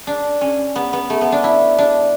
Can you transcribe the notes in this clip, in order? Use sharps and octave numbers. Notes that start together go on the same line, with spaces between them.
D4
C#4
B3
B3
A3
B3
D4
E4
D4